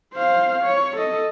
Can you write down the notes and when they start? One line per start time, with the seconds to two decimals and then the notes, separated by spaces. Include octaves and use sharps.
0.14 C5 F5
0.64 C#5
0.96 A4 D#5